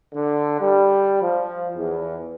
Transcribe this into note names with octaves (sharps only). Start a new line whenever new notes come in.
D3
G3
F3
E2